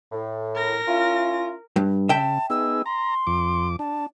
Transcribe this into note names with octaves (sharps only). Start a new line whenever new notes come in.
A2
A#4 A#6
C#4 E4 F4
G2
C#3 E5 G5 A5
B3 D#4 G#4 E6
A#5 C6
F2 D6
D4 A5